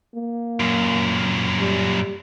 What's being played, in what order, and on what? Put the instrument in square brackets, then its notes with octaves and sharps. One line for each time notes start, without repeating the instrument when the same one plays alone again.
[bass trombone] A#3
[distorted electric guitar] F#2 A#2
[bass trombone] G3